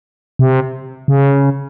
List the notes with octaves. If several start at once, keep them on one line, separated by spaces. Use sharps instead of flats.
C3
C#3